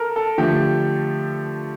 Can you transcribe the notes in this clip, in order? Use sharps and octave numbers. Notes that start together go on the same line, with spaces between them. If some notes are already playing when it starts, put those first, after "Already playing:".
Already playing: A4 A#4
A4
D3 F3 A3 G4